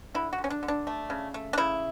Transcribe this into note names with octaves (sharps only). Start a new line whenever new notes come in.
D3 E4
F#4
D3
C#4
D4
D3
D4
A3
C#3
A3
D4
C#3 E4